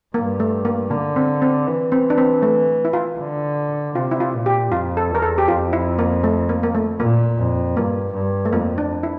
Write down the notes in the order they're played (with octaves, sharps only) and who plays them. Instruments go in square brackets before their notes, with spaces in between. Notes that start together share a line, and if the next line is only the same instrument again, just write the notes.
[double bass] G2 [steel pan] A#3
[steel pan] A3
A#3
[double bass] D3 [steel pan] A#3
[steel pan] C4
C4
[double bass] E3
[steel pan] C4
D4
C4
A3
E4
F4
[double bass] D3
[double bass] C3 [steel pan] F4
[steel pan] E4
F4
[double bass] A#2
[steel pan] G4
[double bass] F2 [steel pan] F4
[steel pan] A4
[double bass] E2 [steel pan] A#4
[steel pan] A4
G4
[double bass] F2 [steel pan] F4
[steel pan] E4
A#3
A3
A#3
A#3
A3
[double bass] A#2 [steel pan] A#3
[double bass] F2
[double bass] G2 [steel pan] A#3
[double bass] G2
[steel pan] A3
[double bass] F2 [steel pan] A#3
[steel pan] D4
E4